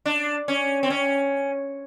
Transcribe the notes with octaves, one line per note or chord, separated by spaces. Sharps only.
D4
C#4
C4
C#4